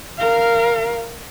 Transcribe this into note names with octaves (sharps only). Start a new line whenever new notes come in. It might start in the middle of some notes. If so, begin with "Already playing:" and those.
A#4 F5